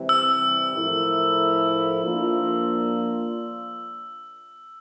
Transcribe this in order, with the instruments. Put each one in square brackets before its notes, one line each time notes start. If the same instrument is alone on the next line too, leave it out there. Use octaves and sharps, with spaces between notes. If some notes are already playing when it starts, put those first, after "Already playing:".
Already playing: [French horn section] C3 E3 G3 C4 E4
[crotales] E6
[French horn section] A2 F3 A3 E4 A#4
F3 A#3 D4 F4